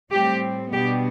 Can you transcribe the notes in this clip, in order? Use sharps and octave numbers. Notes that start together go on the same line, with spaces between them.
A2 G3 C4 G4
B2 G3 B3 D4 G4